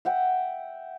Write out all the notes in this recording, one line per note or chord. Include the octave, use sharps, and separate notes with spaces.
E5 F#5 G5